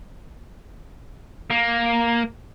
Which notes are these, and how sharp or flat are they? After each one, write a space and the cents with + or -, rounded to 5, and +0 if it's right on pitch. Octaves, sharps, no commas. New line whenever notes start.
A#3 +5